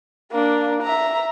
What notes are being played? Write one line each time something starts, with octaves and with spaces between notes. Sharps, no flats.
A#3 D4
E5 A#5